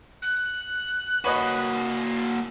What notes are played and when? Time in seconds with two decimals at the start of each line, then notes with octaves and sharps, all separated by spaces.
0.22 F#6
1.24 A#3 F#4 B4 C#5 D#5